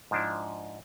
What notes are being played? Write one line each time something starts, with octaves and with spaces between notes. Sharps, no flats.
G#2 F3 D4 E4